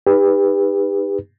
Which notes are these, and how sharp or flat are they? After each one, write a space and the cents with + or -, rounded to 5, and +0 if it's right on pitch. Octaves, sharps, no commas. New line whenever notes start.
D#4 +0 G4 +35 B4 +0